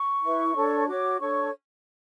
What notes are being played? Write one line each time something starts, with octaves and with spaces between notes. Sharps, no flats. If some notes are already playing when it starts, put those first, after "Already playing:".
Already playing: C#6
E4 B4
D4 A4 C#5
F#4 C#5 D6
D4 A4 C#5 C#6